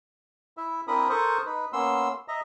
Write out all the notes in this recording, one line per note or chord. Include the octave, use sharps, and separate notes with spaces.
E4 E5
C4 D4 E4 A#4 B5 D#6
A4 A#4 C5 C#6 D#6
D#4 B4
A#3 B3 C#4 C6 E6
D#5 E5 A#5